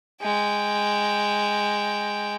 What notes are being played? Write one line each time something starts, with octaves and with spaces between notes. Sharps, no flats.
G#3 G5